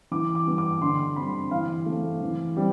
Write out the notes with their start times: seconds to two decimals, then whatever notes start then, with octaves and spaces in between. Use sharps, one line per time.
0.12 E3 D6
0.35 D6
0.46 G3 B3
0.58 D6
0.82 D3 C6
1.16 G3 C4 B5
1.51 E3 F5
1.86 A3 C4
2.21 E3
2.57 G3 C4